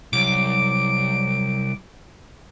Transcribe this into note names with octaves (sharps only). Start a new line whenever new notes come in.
C2 F#3 D6 D7